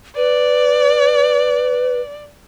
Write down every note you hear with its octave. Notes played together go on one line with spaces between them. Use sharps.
B4 D5